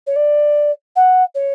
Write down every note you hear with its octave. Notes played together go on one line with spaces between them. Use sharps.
C#5
D5
F#5
C#5